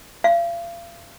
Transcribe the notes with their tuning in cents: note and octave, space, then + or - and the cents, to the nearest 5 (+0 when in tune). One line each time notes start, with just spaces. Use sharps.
F5 -40